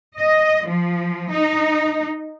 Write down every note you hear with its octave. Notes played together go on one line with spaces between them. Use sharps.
D#5
F3
D#4